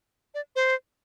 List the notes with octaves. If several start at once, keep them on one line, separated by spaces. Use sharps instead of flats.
D5
C5